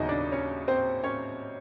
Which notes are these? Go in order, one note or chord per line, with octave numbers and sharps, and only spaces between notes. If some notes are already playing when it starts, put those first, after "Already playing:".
Already playing: D#2 C#3 F#3 B3 D#4 E4 D#5
D4 D5
C#4 C#5
C4 C5
C#4 C#5